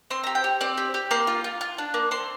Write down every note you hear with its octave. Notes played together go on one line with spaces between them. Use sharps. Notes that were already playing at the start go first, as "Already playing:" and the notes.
C4 C6
G4 A#5
G5
G4
C4 D5
G4
G4
A#3 C6
F4
F4
F4
D4
A#3
C4 C6